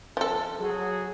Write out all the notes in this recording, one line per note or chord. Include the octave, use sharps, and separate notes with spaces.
F3 A4
F#3 F#4 G#4